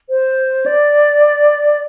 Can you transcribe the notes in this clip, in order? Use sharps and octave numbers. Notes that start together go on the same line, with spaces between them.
C5
D5